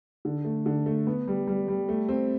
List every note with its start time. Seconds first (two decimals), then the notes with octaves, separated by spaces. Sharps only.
0.25 D3
0.45 A3
0.66 D3
0.86 A3
1.07 B3
1.28 G3
1.47 G3
1.68 G3
1.89 A3
2.09 C4